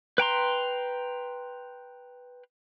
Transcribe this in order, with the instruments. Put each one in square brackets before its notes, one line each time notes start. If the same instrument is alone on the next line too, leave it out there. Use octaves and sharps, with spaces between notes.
[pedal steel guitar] B4 G5 A#5 C6